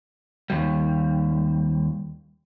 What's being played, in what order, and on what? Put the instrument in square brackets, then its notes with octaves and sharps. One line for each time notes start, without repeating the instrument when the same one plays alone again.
[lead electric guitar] D#2 G3